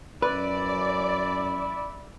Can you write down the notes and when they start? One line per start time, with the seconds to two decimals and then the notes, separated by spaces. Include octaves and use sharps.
0.22 F#2 C#4 E4 B4 D5